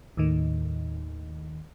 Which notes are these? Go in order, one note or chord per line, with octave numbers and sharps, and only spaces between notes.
D#2 A2 D#3